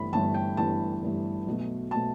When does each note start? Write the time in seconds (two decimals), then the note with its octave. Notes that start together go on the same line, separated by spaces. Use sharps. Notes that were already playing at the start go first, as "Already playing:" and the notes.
Already playing: G1 G2 E3 A3 B5
0.12 G1 G2 E3 A3 A5
0.34 G5
0.57 G1 G2 E3 A3 A5
1.02 G1 G2 E3 A3
1.47 B1 B2 A3
1.91 B2 A3 A5